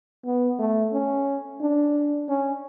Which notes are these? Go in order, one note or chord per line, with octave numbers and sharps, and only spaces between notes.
B3
A3
C#4
D4
C#4